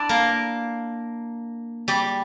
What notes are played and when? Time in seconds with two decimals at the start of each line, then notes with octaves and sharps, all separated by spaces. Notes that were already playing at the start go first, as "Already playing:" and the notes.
Already playing: D4 E4 D5
0.09 A#3 A#4
1.88 G3 G4